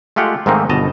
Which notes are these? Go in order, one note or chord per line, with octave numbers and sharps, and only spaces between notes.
G#3 A3 F4 G4 F#5
G#2 D#3 A3 A#3 C4 D#4
G1 B2 D#5 A5 A#5